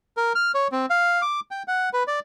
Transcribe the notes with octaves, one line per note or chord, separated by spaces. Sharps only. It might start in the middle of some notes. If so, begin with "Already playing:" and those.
A#4
F6
C#5
C4
F5
D6
G5
F#5
B4
D5